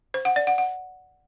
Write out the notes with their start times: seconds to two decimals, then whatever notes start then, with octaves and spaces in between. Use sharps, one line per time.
0.14 C5
0.25 F#5
0.36 D5
0.47 F#5
0.58 F#5